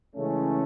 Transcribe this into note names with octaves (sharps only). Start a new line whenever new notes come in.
C#3 E3 G#3 A3 C#4